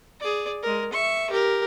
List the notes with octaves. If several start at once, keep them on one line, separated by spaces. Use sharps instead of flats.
G#4 D5
G#3 A#4
E5 C#6
G4 A#4